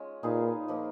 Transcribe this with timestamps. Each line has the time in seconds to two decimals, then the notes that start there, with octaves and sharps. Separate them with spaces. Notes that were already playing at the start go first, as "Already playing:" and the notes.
Already playing: G#3 C#4 F4
0.23 A#2 D#4 G#4 B4 F5
0.68 F3 A#3 D#4